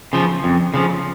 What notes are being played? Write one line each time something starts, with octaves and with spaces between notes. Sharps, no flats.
C#3 F3
F2
C#3 F3